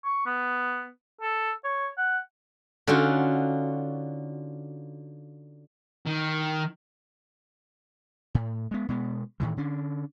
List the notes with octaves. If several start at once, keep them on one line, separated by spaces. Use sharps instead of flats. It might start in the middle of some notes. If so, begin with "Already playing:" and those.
C#6
B3
A4
C#5
F#5
D3 C#4 D#4 F4 F#4
D#3
A2
G#3 B3
B2 G#3 B3
A2 D#3 E3
D3 C#4 D4